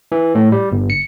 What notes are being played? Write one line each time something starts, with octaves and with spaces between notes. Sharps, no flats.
E3
A2
G3
G1
C#7